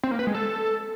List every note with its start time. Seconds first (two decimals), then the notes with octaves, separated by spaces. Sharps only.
0.04 C4
0.11 A#3
0.19 B4
0.27 G#3
0.35 A4